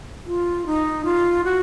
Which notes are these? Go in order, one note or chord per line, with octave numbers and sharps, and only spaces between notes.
F4
D#4
F4
F#4